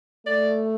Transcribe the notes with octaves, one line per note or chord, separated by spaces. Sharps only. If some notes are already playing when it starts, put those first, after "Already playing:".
A3 D5